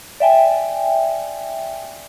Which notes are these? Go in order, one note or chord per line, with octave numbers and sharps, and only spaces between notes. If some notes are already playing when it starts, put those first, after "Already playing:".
D5 E5 G5 G#5